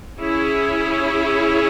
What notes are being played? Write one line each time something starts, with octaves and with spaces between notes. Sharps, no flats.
C#4 E4 G#4 C#5